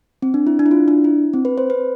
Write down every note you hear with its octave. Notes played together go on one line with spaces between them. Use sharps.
C4
D4
E4
D4
E4
F4
D4
E4
C4
B4
C5
B4